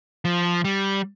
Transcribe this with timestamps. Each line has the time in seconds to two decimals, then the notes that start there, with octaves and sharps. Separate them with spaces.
0.25 F3
0.65 G3